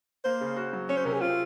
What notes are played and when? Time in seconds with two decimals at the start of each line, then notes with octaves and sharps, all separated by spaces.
0.24 A#3 C5
0.41 C#3
0.56 F#4
0.73 F#3
0.89 C#4 C#5
0.97 C5
1.05 C3 A#4
1.14 G#4
1.21 C4 F4